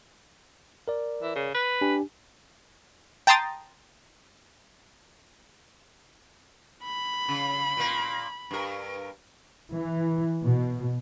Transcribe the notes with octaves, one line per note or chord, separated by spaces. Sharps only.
A#4 D5
E3
C#3
B4
D4 G4 G#5
G5 A5 A#5 C6 D#6 A6
B5
C#3
A#2 A#3
G2 A#4
E3
B2